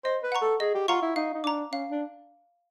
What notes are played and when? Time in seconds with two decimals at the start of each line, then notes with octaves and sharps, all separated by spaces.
0.04 C5 D#5
0.23 B4
0.32 F#5 A#5 C#6
0.42 A4
0.60 G#4 D#5
0.75 G4
0.88 F4 F#5 A#5 C#6
1.02 E4
1.16 D#4 F5
1.34 D#4
1.44 D4 A#5 D6
1.72 C#4 F5
1.91 D4